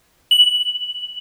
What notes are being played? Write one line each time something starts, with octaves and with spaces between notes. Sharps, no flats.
F#7